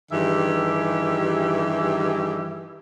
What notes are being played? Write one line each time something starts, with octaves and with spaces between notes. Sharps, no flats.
G2 D#3 E3 G4 G#4 E5